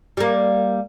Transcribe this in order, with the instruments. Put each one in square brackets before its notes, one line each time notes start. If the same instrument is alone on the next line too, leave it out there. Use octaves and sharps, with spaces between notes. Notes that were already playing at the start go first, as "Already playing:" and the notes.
[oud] G3 A#3